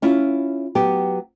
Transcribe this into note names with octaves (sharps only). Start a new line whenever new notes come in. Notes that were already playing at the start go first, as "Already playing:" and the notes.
C#4 E4 F4
F#3 B3 G4